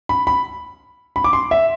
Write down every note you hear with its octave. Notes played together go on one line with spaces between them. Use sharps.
B5
B5
B5
D6
C6
E5